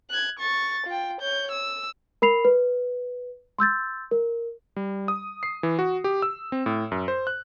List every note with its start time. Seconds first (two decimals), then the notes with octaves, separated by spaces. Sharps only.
0.11 F#6 G#6
0.39 C#6 A6
0.86 F4 G5
1.21 C#5 G6
1.51 E6
2.22 A#4 B5 C7 F7
2.45 B4
3.59 C6 E6 G6 A6
4.11 A#4
4.76 G3
5.08 D#6
5.43 C7
5.63 E3
5.79 F#4
6.04 G4
6.22 E6
6.52 C4
6.66 A2
6.92 F#2
7.08 C5
7.27 F#6